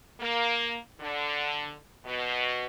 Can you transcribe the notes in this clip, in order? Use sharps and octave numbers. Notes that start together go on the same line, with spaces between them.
A#3
D3
B2